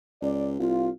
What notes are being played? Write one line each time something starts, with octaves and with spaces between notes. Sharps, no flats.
C#2 D5
C2 F4